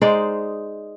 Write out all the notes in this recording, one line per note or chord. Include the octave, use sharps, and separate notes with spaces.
G#3 D#4 C5 D5